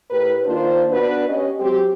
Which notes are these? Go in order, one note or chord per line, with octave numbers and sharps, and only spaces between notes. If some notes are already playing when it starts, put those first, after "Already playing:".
A2 G4 A#4 B4
D#3 A#3 D4 F4 C5
B3 D4 F#4 B4
C#4 G4 D#5
F#3 G#3 C4 G4